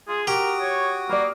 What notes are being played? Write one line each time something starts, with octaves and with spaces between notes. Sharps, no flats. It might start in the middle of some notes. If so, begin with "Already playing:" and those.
F4 G#4
F#4 G4 A#4 D#6
C#5
A#3 B4 D5